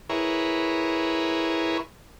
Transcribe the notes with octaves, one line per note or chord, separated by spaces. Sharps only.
E4 G#4 A#4 B4 C#5